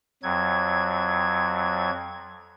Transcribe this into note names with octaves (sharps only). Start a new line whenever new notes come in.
F2 F#3 G#6